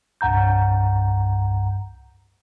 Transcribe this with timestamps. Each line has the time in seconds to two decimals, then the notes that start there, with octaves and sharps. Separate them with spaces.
0.21 C2 G2 F#5 A#5 G6